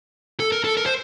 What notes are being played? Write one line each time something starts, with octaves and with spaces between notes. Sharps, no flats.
A4
A#4
A4
A#4
C5